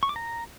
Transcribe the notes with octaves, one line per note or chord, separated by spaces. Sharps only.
C#6
D6
A#5